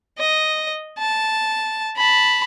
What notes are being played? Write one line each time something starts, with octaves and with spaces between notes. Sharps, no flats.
D#5
A5
A5 B5